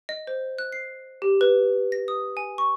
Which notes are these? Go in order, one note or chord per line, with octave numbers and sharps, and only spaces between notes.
D#5
C5
F#6
C7
G4
B4
A#6
D#6
G#5
C#6